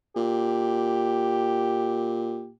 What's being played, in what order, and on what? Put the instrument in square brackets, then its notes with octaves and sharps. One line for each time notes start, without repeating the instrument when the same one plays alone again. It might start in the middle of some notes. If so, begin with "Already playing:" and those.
[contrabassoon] A#2 [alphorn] G4